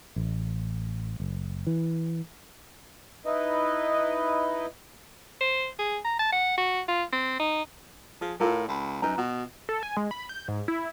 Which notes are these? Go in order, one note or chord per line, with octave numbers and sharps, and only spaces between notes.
A1
F#1
E3
D#4 E4 B4 D#5
C5
G#4
A#5
A5
F#5
F#4
F4
C4
D#4
F3 G#4
A2 F4 A4 A#4
C#2 B5
F#2 D#4 B4 A#5
B2 F#4
A4
G#5
G#3
B5
G6
G#2
E4